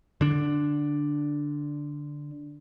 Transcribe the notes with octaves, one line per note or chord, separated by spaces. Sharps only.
D3 D4